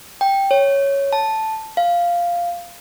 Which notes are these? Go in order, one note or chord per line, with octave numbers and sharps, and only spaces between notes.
G5
C#5
A5
F5